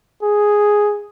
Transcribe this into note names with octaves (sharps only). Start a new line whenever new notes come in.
G#4